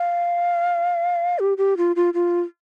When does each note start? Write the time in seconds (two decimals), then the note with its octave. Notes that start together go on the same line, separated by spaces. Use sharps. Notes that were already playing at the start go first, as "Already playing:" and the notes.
Already playing: F5
1.39 G4
1.58 G4
1.77 F4
1.96 F4
2.14 F4